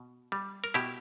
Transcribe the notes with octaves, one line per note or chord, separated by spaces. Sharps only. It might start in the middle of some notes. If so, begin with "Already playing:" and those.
Already playing: B2
G3
A#4
B2 E4 G4